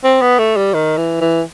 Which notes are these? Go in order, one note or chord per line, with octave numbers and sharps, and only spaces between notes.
C4
B3
A3
G3
D#3
E3
E3